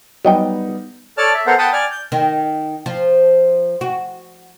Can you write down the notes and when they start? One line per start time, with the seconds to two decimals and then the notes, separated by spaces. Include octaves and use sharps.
0.25 F#3 G3 B3 D#4 D#5 G5
1.18 A4 C#5 D5 A5 F6
1.34 E5
1.47 B3 A4 A#4 C5 F#5
1.58 F#5 G5 A5 B5 D#6
1.73 D5 G#5 F6
1.91 G6
2.12 D#3
2.86 F3
3.81 F#4